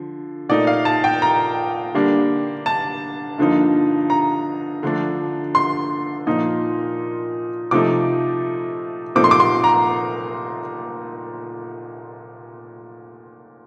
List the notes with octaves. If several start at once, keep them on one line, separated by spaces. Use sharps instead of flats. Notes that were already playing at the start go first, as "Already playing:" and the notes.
Already playing: D3 F3
A#2 A3 D#4 D5
F5
A5
G5
A#5
D3 G3 A#3 D4
A5
G2 D3 F3 A#3 D#4
A#5
D3 F3 A3 D4
C6
A#2 F3 A#3 D#4
C3 F3 A3 D#4 D6
A#2 F3 A3 C4 D#4 D6
C6
D6
C6
A#5